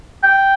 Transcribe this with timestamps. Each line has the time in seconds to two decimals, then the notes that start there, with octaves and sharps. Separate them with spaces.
0.23 G5